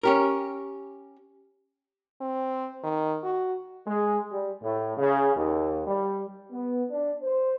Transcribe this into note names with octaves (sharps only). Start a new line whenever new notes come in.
C#4 G4 A#4
C4
D#3
F#4
G#3
G3
A2
C#3
D#2
G3
B3
D4
C5